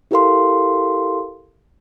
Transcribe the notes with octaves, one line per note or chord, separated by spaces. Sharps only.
E4 G4 A4 A#4 F5 C6